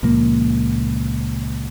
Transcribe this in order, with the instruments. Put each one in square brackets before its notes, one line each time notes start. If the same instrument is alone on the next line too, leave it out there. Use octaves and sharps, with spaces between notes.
[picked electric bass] C#2 A#2 F3 A#3